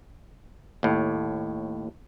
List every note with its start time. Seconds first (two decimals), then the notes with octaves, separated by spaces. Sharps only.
0.83 D#2 A2